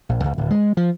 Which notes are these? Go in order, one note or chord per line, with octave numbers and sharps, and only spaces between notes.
A#1
C#2
D1
G#3
F3